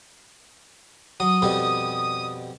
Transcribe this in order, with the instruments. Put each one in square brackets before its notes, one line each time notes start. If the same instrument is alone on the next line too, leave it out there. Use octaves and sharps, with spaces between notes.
[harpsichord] F#3 [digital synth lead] D#6
[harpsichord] F2 B2 G3